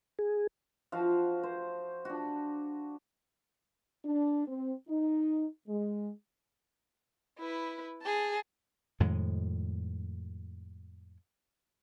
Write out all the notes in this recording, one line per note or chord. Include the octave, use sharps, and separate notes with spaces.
G#4
F3 F#4 F5
C5
D4 F#4
D4
C4
D#4
G#3
E4 B4
G#4 A5
F2 A2 D#3 G#3